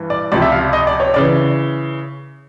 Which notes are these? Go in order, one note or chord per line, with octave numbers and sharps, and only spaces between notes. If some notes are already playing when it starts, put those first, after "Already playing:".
Already playing: G2 E3
D5
C#2 C3 F3 D5
E5
F5
D#5
D5
C#5
C#3 E3 D5